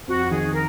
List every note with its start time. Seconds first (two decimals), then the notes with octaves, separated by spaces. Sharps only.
0.07 F2 F#4
0.31 D#3 G#4
0.53 A#4